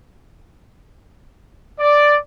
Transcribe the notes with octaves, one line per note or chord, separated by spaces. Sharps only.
D5